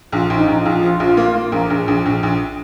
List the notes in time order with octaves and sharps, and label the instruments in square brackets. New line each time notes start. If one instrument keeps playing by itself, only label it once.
[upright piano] A#1 [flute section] F4
[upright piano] A#1
[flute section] D#4
[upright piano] A#1
[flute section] F4
[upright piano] A#1
F3
A#1
A#3
A#3
[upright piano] A#1 [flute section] A#4
[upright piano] A#1
[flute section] G#4
[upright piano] A#1
A#1
A#1